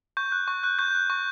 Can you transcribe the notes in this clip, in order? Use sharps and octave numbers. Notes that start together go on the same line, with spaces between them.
C#6 G6
F#6
C#6
F#6
C#6 G6
F#6
C#6